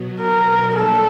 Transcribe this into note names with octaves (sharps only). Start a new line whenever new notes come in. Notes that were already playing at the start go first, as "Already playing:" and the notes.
Already playing: B2 F#3 B3
A#4
G3 A#3 D4 A4